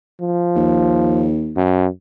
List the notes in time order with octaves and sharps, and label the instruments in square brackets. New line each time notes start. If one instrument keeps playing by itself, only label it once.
[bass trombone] F3
[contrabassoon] D#2
[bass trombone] F#2